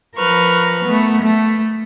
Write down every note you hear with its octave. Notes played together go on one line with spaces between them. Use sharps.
F3 A#4 B4 C#6 F6
A3 B3
A3